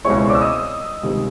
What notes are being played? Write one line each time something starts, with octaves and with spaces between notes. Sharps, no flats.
C#2 B2 G#3 C4 E4 C#5 C#6
C#5 C#6
D5 D6
E6
D#5 D#6
C#2 C3 D#3 G3